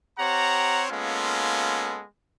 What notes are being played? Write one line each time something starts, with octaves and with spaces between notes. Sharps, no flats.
C4 G4 C#5 F#5 A#5
G#3 A#3 B3 C#4 F4 A4